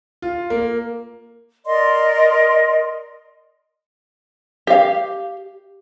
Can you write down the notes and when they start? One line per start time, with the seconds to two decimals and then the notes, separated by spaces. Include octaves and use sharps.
0.22 F4
0.50 A#3
1.65 A#4 D5 D#5 C6
4.67 G4 F5